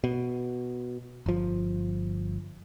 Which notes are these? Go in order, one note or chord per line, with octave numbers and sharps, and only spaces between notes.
B2
G1 F3